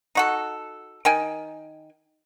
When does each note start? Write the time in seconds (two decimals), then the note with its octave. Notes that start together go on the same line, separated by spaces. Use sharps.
0.15 D#4 F#4 A4
1.05 D#3 G5 G#5